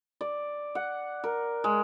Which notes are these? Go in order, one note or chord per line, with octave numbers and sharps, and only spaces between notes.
D5
F#5
A#4
G#3